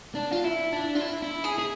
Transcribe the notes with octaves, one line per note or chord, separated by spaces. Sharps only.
D4
F4
E4
D4
F4
E4
E4
G#4
G#4